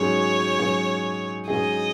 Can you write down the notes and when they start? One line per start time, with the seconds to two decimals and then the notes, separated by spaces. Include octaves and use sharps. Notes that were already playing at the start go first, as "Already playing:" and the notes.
Already playing: G#2 F#3 C#4 G#4 C#5
0.59 G#2 F#3 C#4 G#4
1.48 G#2 F#3 C#4 G#4 D#5